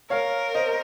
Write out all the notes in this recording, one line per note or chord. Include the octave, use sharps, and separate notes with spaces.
A#4 C#5 F5
C5 D#5